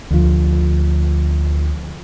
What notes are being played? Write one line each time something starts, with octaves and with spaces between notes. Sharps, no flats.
D2 F3